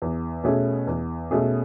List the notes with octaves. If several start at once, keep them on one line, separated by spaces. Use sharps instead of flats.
E2
B2 A3 C#4 G#4
E2
B2 A3 C#4 G#4